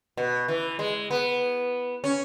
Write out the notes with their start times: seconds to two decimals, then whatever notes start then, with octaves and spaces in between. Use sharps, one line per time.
0.17 B2
0.48 E3
0.79 G#3
1.11 B3
2.04 C#4